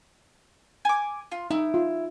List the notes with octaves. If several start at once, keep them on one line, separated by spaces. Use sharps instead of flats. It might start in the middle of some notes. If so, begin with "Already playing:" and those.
G#5 D6
F4
D#4 E4
F4